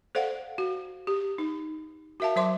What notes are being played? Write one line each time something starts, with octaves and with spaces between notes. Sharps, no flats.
A4 C5 D5 F5 F#5
F#4
G4
D#4
F#4 A#4 E5 F5 A5
F#3 C5 E5 C6 D6